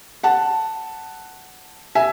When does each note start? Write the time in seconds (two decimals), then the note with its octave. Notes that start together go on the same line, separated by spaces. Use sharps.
0.23 F#5 A5
1.95 E5 G#5